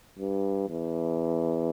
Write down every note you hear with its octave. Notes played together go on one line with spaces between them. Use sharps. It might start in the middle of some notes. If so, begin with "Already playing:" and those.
G2
E2